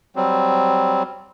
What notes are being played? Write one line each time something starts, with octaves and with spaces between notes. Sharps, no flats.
F#3 G3 C4